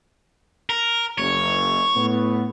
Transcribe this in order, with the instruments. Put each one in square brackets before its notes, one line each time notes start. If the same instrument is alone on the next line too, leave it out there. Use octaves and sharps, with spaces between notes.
[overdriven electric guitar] A#4
[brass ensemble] F#1 [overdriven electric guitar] C#5
[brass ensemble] A2 B3